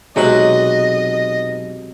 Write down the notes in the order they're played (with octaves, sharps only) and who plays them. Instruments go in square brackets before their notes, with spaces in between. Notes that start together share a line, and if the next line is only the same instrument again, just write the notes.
[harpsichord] B1 B4 [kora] C3 F#3 G#3 [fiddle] D#5